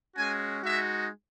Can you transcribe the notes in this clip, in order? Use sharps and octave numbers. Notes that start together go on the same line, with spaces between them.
G#3 C#4 F#4 G#5
G#3 D#4 F#4 E5